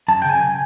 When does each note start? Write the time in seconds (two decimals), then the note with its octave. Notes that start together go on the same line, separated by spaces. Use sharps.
0.08 F#2 A5
0.22 G5
0.25 C#3 G#5